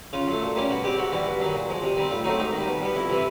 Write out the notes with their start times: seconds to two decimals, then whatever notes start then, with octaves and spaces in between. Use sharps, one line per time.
0.13 C#3 F4
0.27 F#3 A3
0.42 A#2
0.56 G3 A#3 C#4
0.70 B2 F#4
0.84 G#3 C4 G4
0.98 G#2 F#4
1.12 E3 G3
1.27 G2
1.40 D#3 F#3
1.55 A#2
1.69 F3 G#3
1.83 C3
1.97 D#3 G3 C4
2.11 A2 F4
2.24 F#3 A3 C4 D#4
2.39 G#2 D#4
2.53 D#3
2.58 G3
2.67 B2
2.82 G3 B3
2.95 F2 E4
3.10 C3 E3